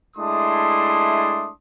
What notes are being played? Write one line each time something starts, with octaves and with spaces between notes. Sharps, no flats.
G#3 A3 D4 E4 C6 D#6